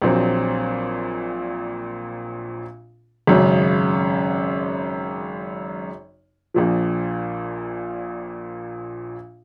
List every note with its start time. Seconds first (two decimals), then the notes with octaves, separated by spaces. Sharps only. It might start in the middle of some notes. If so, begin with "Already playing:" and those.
0.02 A#1 A#2 F#3 C4
3.27 G#1 F#2 C#3
6.54 A#1 A#2 F3